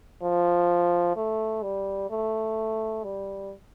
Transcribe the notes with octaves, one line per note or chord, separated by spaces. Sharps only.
F3
A3
G3
A3
G3